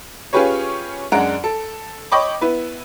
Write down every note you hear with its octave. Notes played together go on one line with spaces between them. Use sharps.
C#4 F4 G4 G#4 B4 C#5
F#2 G#3 D4 F#5 A#5 D7
A4
C#5 D#5 G5 B5 C#6 D6
B3 E4 B4